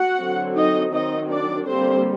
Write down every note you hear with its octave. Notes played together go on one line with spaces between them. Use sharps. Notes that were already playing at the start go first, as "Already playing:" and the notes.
Already playing: F#4 F#5
D3 F#3 C4
D#4 D#5
D#3 F#3 C4 D#4 D#5
D4 D5
D3 G3 A#3 C4 C5